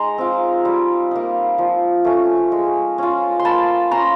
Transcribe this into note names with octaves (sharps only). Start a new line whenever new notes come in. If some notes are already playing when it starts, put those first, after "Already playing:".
Already playing: G#3 D#4 A#5 C6
C4 F4
G3
A#3 D#4
F3
A3 C#4
G#3
C#4 F4
C6
A#3 A5 B5
C#4 F4 A#5 C6